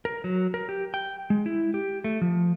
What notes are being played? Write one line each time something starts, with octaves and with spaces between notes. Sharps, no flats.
A#4
F#3
A#4
G4
G5
G#3
E4
G4
A3
F3